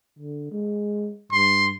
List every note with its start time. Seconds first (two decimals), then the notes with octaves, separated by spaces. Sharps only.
0.19 D3
0.51 G#3
1.32 G2 C6